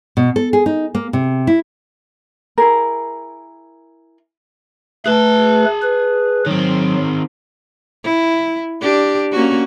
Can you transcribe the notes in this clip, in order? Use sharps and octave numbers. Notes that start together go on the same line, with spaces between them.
B2
A4
G#4
D#4
A#3
C3
E4
E4 G#4 A#4
A3 G#4 B4 A5
B4
D#3 F#3 C4
E4
D4 G4
A#3 C#4 F#4